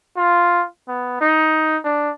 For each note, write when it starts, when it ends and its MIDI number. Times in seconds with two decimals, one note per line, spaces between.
0.17 0.64 65
0.88 1.17 59
1.21 1.77 63
1.84 2.11 62